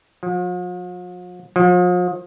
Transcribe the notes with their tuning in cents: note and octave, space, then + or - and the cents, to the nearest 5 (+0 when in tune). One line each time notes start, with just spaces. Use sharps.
F3 +45
F3 +40